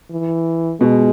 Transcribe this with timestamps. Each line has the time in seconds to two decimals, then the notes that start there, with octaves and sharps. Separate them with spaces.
0.11 E3
0.80 B2 G#3